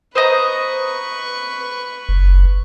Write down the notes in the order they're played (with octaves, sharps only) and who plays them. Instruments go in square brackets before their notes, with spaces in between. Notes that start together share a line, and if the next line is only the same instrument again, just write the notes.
[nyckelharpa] B4 C#6 [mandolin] C5 D#5 A#5
[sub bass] F#1